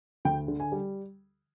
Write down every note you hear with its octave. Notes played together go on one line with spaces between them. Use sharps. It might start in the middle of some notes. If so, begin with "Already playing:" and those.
D2 G5
D3
G#5
G3